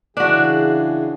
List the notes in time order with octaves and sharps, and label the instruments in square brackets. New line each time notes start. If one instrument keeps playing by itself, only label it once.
[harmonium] C#3 E3 G#4 [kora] D4 F#4